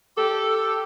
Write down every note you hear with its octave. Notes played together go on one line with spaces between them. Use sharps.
G4 A4